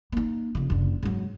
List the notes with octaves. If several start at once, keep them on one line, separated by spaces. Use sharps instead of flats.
A#3 D#4
F2 C#3
F#1 D3
G#2 F#3